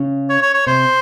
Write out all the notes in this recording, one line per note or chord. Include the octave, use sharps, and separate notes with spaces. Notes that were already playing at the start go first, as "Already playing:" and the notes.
Already playing: C#3 C#4
C#5
C#5
C#5
C3 C4 C5